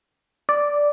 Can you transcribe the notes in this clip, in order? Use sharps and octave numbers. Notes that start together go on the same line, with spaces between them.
D5